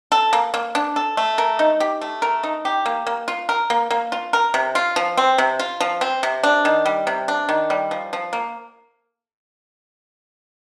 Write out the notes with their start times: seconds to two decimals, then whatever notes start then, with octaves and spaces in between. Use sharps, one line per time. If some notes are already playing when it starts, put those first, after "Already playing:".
0.12 A4
0.33 A#3
0.54 A#3
0.75 D4
0.96 A4
1.17 A3
1.38 A#4
1.59 D#4
1.80 G4
2.01 A3
2.22 A#4
2.43 D#4
2.65 G4
2.86 A#3
3.07 A#3
3.28 F4
3.49 A#4
3.70 A#3
3.91 A#3
4.12 F4
4.33 A#4
4.54 C3
4.75 F4
4.96 F3
5.17 C4
5.38 C3
5.59 F4
5.80 F3
6.01 C4
6.23 C3
6.43 D4
6.65 D#3
6.86 G3
7.07 C3
7.28 D4
7.49 D#3
7.70 G3
7.91 F3
8.13 F3
8.33 A#3